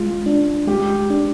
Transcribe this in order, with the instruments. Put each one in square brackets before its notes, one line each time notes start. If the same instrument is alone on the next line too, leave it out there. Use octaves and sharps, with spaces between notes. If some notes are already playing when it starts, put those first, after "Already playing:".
Already playing: [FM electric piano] G#3 [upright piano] F4
[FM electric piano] D4
[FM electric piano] G#3 [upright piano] G4
[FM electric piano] D4